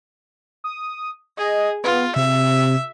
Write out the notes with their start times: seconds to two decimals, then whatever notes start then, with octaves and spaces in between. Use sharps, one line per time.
0.64 D#6
1.37 G#4 D#5
1.84 B3 F4
2.16 C3 E5